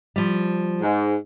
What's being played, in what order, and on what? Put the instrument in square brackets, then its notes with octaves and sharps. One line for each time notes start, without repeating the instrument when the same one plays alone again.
[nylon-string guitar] F3 G3
[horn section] G#2